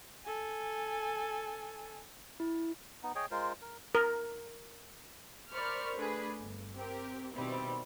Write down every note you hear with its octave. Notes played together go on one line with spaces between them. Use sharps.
A4 G#5
E4
B3 D#4
G#4 C#5 D#5 G5
G#3 F4 A#4 C5
A#4
A#4
A#4 C5 D5 B5 C#6 F6
A3 D4 G#4 B4
G1
C4 G4 A#4
B2 D#3 G3 C4 E4